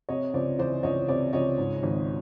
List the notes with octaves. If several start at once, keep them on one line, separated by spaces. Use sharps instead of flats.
C3 C#5 D#5
C#2 C5 D5
E3 C5 D5
C#2 C#5 D#5
C3 C5 D5
C#2 C#5 D#5
G#2
G#1